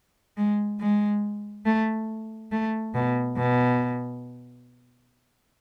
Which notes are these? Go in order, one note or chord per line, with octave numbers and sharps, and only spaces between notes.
G#3
G#3
A3
A3
B2
B2